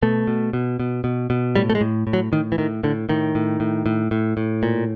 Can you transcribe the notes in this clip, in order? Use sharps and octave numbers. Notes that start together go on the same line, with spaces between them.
B2 A3
B2
B2
B2
B2
B2
A2 G3
A3
G#3
A2
A2
F#3
A2 D#3
E3
A2 D#3
A2 D3
A2 D#3
A2
A2
A2
A2
A2
A#2